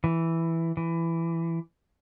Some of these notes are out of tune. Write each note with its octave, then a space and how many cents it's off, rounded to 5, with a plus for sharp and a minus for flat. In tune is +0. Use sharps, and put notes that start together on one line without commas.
E3 +0
E3 +15